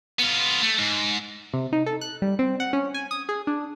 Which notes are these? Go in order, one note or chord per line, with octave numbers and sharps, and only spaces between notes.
B3 F4
A3
G#2
C3
D#4
A4
F#6
G3
C4
F#5
C#4
G#5
D#6
G#4
D4